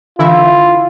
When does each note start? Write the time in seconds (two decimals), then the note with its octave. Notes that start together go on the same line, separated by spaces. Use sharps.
0.19 D3 E3 E4 F4